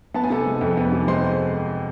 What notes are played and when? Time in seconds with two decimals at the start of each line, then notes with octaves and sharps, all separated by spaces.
0.14 B3 A5
0.24 G#5
0.30 C3 A4 A5
0.46 G#3
0.61 F2
0.77 B3
0.92 C3
1.08 G#3 C5 C6